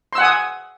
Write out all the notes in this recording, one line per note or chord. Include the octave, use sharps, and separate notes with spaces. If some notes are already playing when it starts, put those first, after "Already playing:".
F#5 G#5 C6 D#6 E6